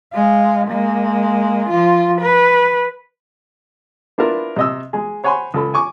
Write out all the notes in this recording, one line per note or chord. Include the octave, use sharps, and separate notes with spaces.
G#3 F5
G#3 A#3
F3 F4
B4
B3 D4 E4 F4 A#4
C3 D#5 E6
G#3 G#4
C5 C#5 F#5 G#5 B5 C6
C#2 A4 B5
G#5 C#6 D6